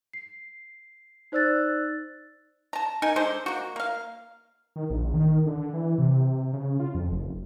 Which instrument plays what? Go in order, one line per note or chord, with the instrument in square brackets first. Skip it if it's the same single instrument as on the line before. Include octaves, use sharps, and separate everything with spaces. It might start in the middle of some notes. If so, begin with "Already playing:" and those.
[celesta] C7
D#4 C5 D5 E6 F#6 A6
[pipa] A5 A#5
D#4 A#4 G#5
G#3 D4 A4 C5
A#3 F#4
A#3 F5
[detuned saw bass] D#3
A#1
D#3
D3
E3
C3
C#3
F4
F2
F#1